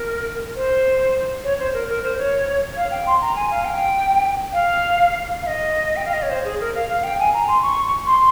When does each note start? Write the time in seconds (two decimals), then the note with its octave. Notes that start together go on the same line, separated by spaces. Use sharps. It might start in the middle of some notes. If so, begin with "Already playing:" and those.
Already playing: A#4
0.56 C5
1.44 C#5
1.59 C5
1.74 A#4
1.89 A#4
2.04 C5
2.18 C#5
2.77 F5
2.91 G5
3.07 C6
3.22 A#5
3.36 G#5
3.51 F5
3.65 G5
4.53 F5
5.42 F5
5.47 D#5
5.96 G5
6.05 F5
6.13 D#5
6.23 C#5
6.30 C5
6.45 G#4
6.60 A#4
6.75 F5
6.90 F5
7.04 G5
7.19 G#5
7.34 A#5
7.48 C6
7.63 C#6
8.07 C6